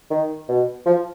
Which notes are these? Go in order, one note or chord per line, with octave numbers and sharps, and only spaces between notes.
D#3
B2
F3